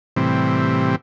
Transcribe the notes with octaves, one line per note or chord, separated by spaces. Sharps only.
A2 C3 E3 G3 C4